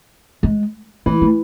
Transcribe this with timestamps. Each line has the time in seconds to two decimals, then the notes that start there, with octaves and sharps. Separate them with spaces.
0.43 G#3
1.06 E3 A3
1.22 A3